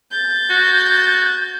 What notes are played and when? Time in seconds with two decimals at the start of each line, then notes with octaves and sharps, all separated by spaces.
0.11 G6 A6
0.50 F#4